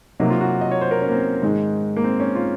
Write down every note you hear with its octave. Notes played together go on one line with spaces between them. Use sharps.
C3 F#3 A#3 D#4
F4
F#4
D#5
C#5
C5
A#4
C#4
A#3
C4
G#2 D#3 G#3
A#3
C4
C#4
F4